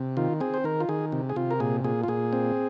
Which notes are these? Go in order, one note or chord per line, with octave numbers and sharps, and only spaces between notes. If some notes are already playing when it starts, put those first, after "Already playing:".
Already playing: C3
D#3 F4
C4 G#4
C5
D#3 A#4
F4
D#3 G#4
C3
G#4
C3 F4
A#4
A#2 G#4
A#2 G#4
F4
A#2 G#4
C4